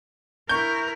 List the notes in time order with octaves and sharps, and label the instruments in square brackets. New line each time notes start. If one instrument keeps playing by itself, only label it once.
[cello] E4 A#4 [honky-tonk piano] C#6 G6